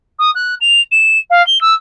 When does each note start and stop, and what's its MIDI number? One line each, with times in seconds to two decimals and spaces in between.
0.19 0.31 87
0.35 0.55 90
0.61 0.81 101
0.92 1.19 100
1.30 1.45 77
1.47 1.61 103
1.61 1.74 88